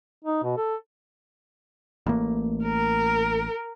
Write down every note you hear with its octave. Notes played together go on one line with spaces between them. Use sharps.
D#4
B2
A4
A1 A2 A#3
A#4